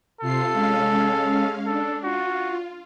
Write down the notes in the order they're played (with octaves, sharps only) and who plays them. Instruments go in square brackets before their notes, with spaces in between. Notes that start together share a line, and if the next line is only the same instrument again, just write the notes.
[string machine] C3 F4 C7 [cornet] A4
[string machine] G#3 C#4 F5
[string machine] D4 [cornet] A4
[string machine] F4 [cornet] F#4